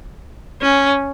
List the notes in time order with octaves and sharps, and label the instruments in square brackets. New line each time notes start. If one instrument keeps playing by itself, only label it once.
[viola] C#4